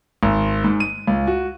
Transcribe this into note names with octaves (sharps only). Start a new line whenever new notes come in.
G#1
G#2
D#7
C#2
F#4